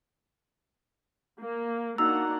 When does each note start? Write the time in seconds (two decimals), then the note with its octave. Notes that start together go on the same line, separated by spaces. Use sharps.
1.41 A#3
1.98 A#3 D4 D#4 F#4 F#5 A#5 E6